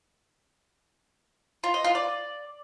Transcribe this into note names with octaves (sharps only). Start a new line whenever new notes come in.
F4
D#5
F4
D5